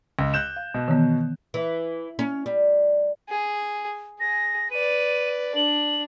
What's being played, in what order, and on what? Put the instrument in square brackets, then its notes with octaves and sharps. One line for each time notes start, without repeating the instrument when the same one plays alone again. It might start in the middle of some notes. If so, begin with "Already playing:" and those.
[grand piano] C#2
F#6 G6 E7
[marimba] F5
[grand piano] B2
[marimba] D#3 E3 B3
[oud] E3
C#4
G3
[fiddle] G#4
[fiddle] G#4 [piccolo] A#6
[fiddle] B4 D5 [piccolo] D#7
[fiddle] D4 [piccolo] F#7